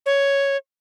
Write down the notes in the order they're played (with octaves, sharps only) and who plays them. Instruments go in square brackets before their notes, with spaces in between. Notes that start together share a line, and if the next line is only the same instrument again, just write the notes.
[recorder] C#5